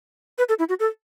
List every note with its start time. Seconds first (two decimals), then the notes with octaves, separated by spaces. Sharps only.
0.38 B4
0.49 A4
0.59 E4
0.69 F#4
0.80 A4